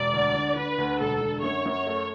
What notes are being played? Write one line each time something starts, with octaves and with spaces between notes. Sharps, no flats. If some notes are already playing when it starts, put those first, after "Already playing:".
Already playing: E1 D5
D2
D3
D3 B4
D2
E1 A4
D3
F#2 C#5
F#2
C#5
A3